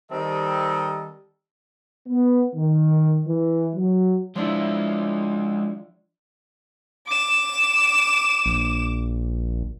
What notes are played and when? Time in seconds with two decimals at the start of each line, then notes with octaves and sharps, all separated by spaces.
0.10 D#3 G3 C4 A4 D#5
2.07 B3
2.56 D#3
3.27 E3
3.74 F#3
4.36 F3 G#3 D4 E4 F4
7.06 D6 E7
8.46 A#1